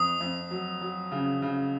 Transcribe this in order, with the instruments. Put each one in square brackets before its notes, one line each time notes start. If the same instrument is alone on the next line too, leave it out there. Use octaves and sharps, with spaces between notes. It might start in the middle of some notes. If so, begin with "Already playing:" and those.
Already playing: [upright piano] F2 [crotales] D#6
[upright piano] F2
F#3
F#3
C#3
C#3